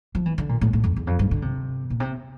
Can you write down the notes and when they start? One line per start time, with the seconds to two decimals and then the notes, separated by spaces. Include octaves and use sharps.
0.15 F3
0.26 E3
0.38 D3
0.49 A#2
0.61 A2
0.73 A2
0.84 F2
0.96 E2
1.07 F2
1.19 G2
1.31 D3
1.42 C3
1.90 A#2
2.00 C3